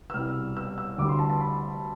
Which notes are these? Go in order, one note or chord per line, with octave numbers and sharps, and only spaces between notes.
E6
C2 B2 G3 F6
E6
E6
D2 D3 G3 D6
C6
A5
A5
B5